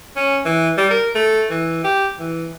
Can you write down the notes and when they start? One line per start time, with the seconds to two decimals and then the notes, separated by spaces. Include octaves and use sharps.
0.16 C#4
0.45 E3
0.77 G3
0.91 A#4
1.15 A3
1.50 E3
1.84 G4
2.20 E3